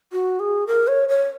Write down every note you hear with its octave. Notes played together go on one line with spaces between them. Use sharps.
F#4
G#4
A#4
C#5
C#5